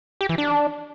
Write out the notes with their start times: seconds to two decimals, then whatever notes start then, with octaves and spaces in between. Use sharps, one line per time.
0.21 G4
0.29 E3
0.38 D4